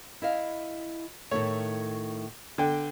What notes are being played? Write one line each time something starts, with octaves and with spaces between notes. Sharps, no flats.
E4 D#5 F5
A2 D#3 A3 C#5
D3 B3 G5